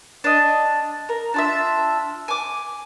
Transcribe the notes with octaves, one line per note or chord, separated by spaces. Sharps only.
D4 D#5
A#4
D4 F4 E5
G#5 D6